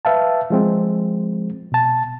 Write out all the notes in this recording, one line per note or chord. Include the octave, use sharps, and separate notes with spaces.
B4 E5 F5 A5
F3 G#3 C4
B2 A5